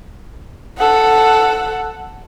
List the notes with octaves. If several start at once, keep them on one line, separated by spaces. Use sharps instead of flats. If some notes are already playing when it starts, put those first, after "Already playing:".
A4 F#5